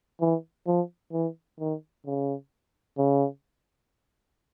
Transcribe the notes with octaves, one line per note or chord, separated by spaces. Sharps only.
E3
F3
E3
D#3
C#3
C#3